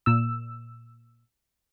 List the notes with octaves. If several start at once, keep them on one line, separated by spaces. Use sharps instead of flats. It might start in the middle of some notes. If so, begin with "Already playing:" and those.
A#2 E6